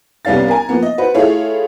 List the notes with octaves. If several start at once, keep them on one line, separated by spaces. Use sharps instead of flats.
C2 G3 B3 C#4 F5 A6
A#4 G#5
F3 A#3 B3
D#5
F#4 B4 C5
A3 E4 F4 G#4 C#5 F5